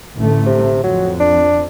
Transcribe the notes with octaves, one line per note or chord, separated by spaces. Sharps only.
A1 D3 A3
C3
F2 F#3
D4